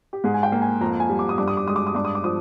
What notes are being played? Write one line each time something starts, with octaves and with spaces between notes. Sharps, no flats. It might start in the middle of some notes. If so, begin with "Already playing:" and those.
G4
G#2 G#4
G#5
G5
A#3
G#5
F2 A#5
G#5
G3
D6
D#6
G2 D6
D#6
D6
G#3 D#6
D6
D#6
G2 D6
D#6
D6
F3 D#6